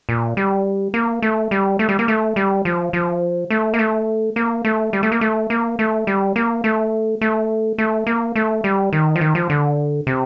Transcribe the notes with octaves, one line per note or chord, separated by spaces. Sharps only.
A#2
G3
A#3
A3
G3
A3
G3
A#3
A3
G3
F3
F3
A3
A#3
A3
A#3
A3
G3
A3
A#3
A3
A#3
A3
G3
A#3
A3
A3
A3
A#3
A3
G3
D#3
F3
D#3
F3
D3
C3